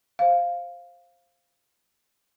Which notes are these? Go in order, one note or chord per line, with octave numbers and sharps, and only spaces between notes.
C5 F5